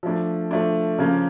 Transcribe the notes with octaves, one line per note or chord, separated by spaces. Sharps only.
F3 A3 D4
F3 A3 D4
C#3 F3 A#3 C#4